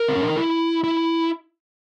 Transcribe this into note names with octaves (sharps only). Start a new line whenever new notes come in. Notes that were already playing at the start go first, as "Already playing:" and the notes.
Already playing: A#4
C4
C#4
D4
D#4
E4
E4